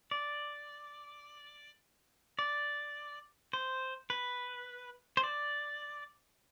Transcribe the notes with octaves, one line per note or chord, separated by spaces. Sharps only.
D5
D5
C5
B4
C5
D5